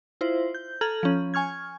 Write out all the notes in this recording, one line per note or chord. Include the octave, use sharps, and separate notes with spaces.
E4 F4 C5
G6
A4 A#5 F6 G#6 F#7
F3 C#4
G#5 C#6 F6 G#6